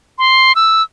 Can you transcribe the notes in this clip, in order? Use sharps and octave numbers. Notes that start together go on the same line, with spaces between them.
C6
E6